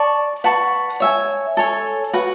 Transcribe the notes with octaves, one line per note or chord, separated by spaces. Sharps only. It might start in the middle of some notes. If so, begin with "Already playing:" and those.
Already playing: D5 A5 C#6
B4 F#5 A5 C#6
C#5 E5 G#5
A4 C#5 G#5
F#4 B4 F#5